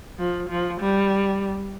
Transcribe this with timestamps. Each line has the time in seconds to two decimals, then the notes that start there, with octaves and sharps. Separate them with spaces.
0.18 F3
0.49 F3
0.80 G3